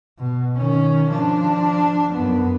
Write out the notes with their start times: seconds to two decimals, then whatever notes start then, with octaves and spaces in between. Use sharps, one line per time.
0.19 B2
0.57 D#3 C#4
1.10 F3 D4
2.13 F#2 B3